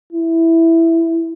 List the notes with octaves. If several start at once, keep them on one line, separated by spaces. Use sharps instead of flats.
E4